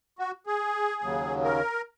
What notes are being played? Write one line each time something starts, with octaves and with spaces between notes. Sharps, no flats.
F#4
G#4
D#2 C#3 F#3
A#4